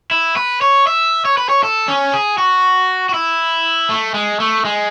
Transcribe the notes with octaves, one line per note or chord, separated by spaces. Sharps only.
E4
B4
C#5
E5
C#5
B4
C#5
A4
C#4
G#4
F#4
F#4
E4
A3
G#3
A3
G#3